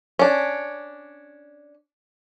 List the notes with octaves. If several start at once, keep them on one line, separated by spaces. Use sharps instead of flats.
C#4 D4